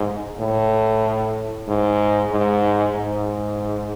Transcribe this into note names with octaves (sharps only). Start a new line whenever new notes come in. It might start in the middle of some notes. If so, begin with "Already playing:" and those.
Already playing: G#2
A2
G#2
G#2
G#2